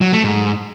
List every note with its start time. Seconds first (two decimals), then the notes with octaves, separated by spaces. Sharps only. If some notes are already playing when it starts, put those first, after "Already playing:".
0.01 F#3
0.13 A3
0.24 G#2